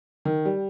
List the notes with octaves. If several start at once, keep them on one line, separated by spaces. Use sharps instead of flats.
D#3
G3